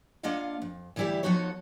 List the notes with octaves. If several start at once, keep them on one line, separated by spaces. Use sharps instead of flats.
A#3 D4 F4 D#5 F5 F#5
F2
D2 E3 G3 E4 G4 D5
F3 B3 D#4 F#4 A4 C#5